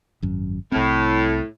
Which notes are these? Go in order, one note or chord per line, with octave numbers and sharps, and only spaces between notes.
G#1 F#2
C2 A2 C4